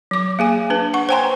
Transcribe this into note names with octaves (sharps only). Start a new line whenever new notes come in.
F#3 D6
A#3 G#4 G#5
D4 B4
F#5 C#6
C5 C#5 G5 G#5 A#5 C6